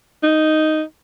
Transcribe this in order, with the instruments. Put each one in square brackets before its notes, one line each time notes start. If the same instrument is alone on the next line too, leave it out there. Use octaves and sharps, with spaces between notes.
[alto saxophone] D#4